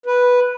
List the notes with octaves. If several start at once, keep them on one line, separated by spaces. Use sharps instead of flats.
B4